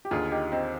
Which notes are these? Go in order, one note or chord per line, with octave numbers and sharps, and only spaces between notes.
G4
D#2 D3 F4 G#4
D#4 G4
C4 D#4